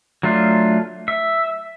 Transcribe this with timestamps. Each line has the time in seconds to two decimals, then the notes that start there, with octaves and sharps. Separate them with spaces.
0.23 F#3 A3 D4 F4
1.08 E5